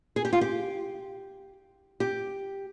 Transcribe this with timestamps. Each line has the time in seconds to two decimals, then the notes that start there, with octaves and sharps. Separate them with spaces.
0.16 G#4
0.25 G4
0.33 F4
0.41 G4
2.00 G4